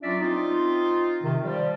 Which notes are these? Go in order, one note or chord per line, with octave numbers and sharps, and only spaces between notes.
F#3 C#4 D4 F4 D5 E5
C4 D#4 F4
C3 D#3
F3 G3